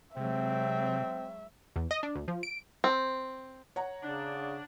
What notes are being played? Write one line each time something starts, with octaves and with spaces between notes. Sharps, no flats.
C3 F#3 G#3 C4 E5
E2
D#5
D4
D2
F3
D7
C4
C#5 F#5 A#5
C#3 D4